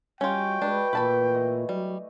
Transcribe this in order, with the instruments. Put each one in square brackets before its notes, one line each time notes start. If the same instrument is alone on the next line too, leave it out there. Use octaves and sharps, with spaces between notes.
[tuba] G3 [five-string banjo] C#4 F4 [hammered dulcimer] F#4 C#5 D#5 [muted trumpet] G5
[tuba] G#3 [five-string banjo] D4 [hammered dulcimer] G4 B4 C#5
[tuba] A#2 [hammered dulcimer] E3 A3 [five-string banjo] B4 A5 B5
[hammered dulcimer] D#5
[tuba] F#3 [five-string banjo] G3